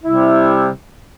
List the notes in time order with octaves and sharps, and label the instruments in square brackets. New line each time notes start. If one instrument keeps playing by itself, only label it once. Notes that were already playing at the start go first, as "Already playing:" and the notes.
[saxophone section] C3 G3 E4